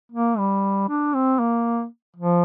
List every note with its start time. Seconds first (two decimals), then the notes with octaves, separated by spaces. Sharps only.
0.12 A#3
0.38 G3
0.89 D4
1.14 C4
1.39 A#3
2.16 F3